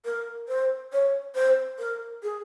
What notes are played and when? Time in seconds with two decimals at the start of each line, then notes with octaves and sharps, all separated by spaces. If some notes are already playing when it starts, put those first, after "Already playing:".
0.05 A#4
0.48 C5
0.93 C#5
1.35 C5
1.79 A#4
2.23 G#4